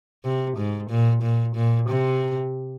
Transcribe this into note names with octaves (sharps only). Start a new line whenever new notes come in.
C3
G#2
A#2
A#2
A#2
C3